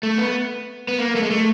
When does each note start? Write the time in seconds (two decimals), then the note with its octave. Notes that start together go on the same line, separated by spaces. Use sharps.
0.03 A3
0.18 B3
0.88 B3
0.99 A#3
1.15 A3
1.23 G#3
1.31 A3